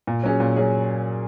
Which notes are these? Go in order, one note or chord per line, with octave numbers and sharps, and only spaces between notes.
A#2
F#3 C#4 G#4
A#2
F#3 C#4 G#4